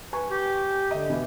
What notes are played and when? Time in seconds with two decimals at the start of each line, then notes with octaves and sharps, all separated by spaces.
0.13 B4 G#5 C#6
0.31 G4
0.91 D3 D#5
1.10 B2 E3 B3